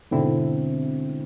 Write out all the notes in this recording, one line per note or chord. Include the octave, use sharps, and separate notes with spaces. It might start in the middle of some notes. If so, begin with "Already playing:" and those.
G#2 B2 D3 C4 E4